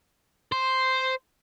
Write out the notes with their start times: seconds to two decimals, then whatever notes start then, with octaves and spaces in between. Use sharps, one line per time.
0.52 C5